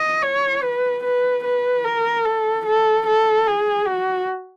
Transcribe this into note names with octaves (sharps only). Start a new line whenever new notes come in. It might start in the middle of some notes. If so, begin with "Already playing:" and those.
Already playing: D#5
C#5
B4
B4
B4
A#4
A4
A4
A4
G#4
F#4